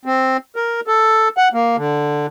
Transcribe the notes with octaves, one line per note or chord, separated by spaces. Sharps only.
C4
A#4
A4
F#5
A#3
D3